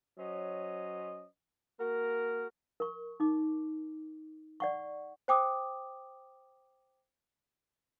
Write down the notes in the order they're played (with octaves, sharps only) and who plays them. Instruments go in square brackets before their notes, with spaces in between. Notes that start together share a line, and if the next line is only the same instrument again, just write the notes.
[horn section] F#3 C#4 C5 D#5
A#3 F#4 A#4
[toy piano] A#4 C#6
D#4 D6
D5 F#5 C#6
[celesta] C5 G5 D6 D#6